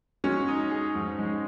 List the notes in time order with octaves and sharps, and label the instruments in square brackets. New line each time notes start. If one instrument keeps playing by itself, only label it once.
[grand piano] G#3 [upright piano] C#4 F#4
[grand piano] D#4
G#4
G#2
G#3